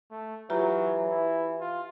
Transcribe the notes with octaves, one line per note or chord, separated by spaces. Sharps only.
A3
E3 F#3 F4 G4 A#5
E4
F4